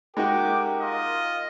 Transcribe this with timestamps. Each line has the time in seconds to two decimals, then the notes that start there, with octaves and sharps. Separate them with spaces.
0.17 G#3 D#4 F#4 G4 A#4 D6
0.81 F4 D#5